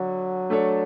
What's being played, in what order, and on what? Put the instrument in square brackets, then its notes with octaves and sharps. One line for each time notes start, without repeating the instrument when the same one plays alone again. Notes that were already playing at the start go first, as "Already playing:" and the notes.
Already playing: [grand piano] D3 [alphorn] F#3
[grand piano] A3 D4 A4 C#5